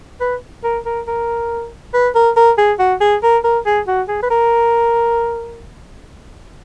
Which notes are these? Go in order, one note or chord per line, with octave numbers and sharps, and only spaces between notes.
B4
A#4
A#4
A#4
B4
A#4
A#4
G#4
F#4
G#4
A#4
A#4
G#4
F#4
G#4
B4
A#4